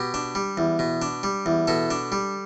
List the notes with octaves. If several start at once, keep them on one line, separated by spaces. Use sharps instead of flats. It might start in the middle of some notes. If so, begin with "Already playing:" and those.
Already playing: B2 G4
D4
G3
E2
B2
D4
G3
E2
B2 A4
D4
G3